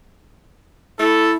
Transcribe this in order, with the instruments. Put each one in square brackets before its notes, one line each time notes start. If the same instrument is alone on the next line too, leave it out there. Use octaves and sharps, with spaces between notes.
[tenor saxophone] A3 [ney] E4 [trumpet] A4